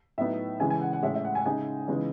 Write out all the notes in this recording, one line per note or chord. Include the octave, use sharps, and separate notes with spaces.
A2 F#3 B3 D#4 E5
C#3 E3 G#3 G#5
G#5
F#5
F#5
A2 G#3 C#4 E5
E5
F#5
G#5
C#3 G#3 D#4 G#5
C#3 E3 G#3 B3 D#4